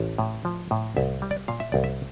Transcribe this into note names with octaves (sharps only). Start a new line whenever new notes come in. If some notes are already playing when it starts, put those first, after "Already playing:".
Already playing: A1
A2
F3
A2
C2 E5
G3
D5
A#2 F5
E5
C2 D5
E5